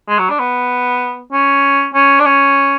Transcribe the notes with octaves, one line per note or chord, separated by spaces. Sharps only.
G#3
F#3
D4
B3
C#4
C#4
D4
C#4